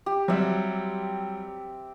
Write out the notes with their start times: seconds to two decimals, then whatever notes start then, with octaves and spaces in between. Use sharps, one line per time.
0.06 G4
0.28 F#3 G3 C4 E5